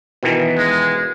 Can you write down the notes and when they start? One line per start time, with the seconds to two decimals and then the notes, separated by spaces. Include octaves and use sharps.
0.23 B2 D#3 E3
0.58 G#3